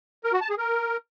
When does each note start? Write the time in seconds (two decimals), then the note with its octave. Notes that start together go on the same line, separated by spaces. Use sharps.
0.24 A#4
0.33 F#4
0.41 A5
0.49 G#4
0.58 A#4